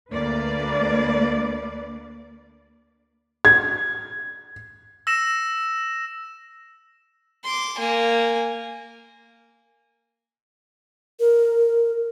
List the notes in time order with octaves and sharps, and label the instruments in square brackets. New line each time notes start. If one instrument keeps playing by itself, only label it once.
[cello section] D2 A#3 B4 D5
[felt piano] G#6
[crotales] E6 A#6 E7
[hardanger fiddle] C6 D6
A#3 G#5
[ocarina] A#4